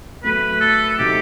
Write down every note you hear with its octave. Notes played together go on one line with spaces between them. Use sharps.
A2 F#3 A3 B4
A4
A4
C3 F#3 A3 D#4 F#4 G4